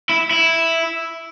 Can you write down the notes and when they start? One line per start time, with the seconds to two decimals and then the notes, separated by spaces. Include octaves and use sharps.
0.09 E4
0.31 E4